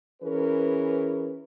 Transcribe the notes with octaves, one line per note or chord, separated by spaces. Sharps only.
E3 C#4 G#4 A#4 B4